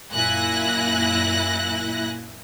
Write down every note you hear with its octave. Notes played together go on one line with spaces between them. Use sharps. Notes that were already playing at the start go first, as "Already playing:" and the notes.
F#2 A#2 E4 G#5 F#6 A#6